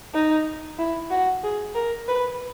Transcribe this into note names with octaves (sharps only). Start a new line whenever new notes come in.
D#4
E4
F#4
G#4
A#4
B4